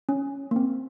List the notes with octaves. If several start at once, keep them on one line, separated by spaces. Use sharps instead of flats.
C#4
A#3
C4